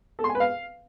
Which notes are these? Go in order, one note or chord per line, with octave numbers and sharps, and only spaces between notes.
A4
C6
G#5
B4
F5